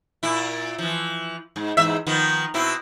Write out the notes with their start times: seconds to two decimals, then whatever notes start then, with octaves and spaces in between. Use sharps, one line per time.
0.23 A#2 E4
0.78 E3 F3
1.56 G#2
1.77 E2 G#2 E5
2.07 D#3 F3 B3
2.54 B2 C4 E4